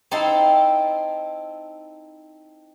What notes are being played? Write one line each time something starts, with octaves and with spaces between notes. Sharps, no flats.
C4 D#4 E4 A4 A5 C6